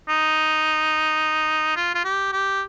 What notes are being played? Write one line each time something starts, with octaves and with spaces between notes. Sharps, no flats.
D#4
F4
F4
G4
G4